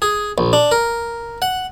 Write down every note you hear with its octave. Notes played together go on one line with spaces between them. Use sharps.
G#4
A#1
D4
A#4
F#5